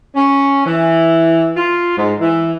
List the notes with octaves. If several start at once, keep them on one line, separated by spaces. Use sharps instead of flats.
C#4
E3
F4
G#2
E3